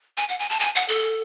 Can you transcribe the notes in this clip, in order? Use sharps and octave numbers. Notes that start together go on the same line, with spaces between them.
G#5
F#5
G#5
A5
G#5
F#5
A4